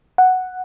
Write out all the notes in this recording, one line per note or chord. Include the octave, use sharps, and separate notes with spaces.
F#5